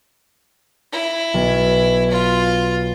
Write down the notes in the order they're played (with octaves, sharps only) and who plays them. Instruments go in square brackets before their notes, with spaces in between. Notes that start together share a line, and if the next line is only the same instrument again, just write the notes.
[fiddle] E4
[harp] B1
[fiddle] F4